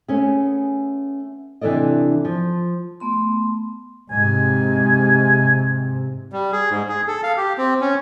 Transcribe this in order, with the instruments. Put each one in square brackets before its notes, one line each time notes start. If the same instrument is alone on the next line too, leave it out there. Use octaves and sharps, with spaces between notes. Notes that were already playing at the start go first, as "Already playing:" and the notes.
[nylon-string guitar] A3 B3 C#4 G#4
C3 E3 D4 A4 D5 D#5
F3
[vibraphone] A3 B3 C6
[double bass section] G#2 C3 [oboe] G#5
[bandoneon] G3
G#4
G#2
G#4
A4
F5
G4
C4
C#4